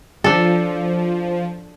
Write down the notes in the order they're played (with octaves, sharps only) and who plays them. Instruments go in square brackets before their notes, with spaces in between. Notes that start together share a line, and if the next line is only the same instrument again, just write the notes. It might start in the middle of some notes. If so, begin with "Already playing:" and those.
[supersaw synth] F3 [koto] D4 A4